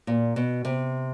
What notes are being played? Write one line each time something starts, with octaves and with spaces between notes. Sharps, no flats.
A#2
B2
C3